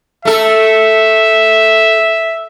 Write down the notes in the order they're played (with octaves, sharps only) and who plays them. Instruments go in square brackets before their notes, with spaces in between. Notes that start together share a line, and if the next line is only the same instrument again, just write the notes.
[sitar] A3 A4 [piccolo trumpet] E5